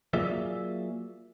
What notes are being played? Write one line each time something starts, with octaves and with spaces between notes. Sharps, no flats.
F#3 A#3 F4 G#4 D5 E5